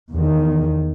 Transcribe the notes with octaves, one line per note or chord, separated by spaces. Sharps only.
E2 D#3